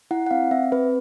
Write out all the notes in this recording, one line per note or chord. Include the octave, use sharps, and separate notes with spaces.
E4 F#5
F#5
C4 F5
C4 E5
C4 B4